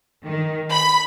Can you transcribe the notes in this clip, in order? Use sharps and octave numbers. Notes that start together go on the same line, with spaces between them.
D#3
B5